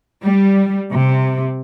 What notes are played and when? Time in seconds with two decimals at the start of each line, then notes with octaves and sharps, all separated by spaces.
0.24 G3
0.93 C3